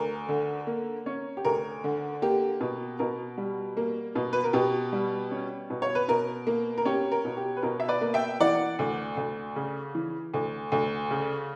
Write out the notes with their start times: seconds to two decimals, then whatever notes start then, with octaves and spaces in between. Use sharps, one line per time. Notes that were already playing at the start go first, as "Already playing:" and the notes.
Already playing: D2 A#4
0.29 D3
0.67 A#3
1.06 C#4
1.37 G4
1.45 D2 A#4
1.84 D3
2.22 A#3 G4
2.60 B2
2.99 B2 A#4
3.38 G3
3.77 A#3
4.15 B2
4.33 B4
4.44 A#4
4.53 B2 G4
4.93 G3
5.31 C#4
5.70 B2
5.82 C#5
5.95 B4
6.08 B2 A#4
6.47 A#3
6.78 A#4
6.85 C#4 G4
7.12 A#4
7.25 B2
7.37 G4
7.57 B4
7.62 B2 A#4
7.80 E5
7.88 B4 D5
8.01 A#3
8.14 E5 G5
8.40 E3 D5 F#5
8.79 D2
9.17 D2
9.56 C#3
9.95 E3
10.34 D2
10.72 D2
11.11 C#3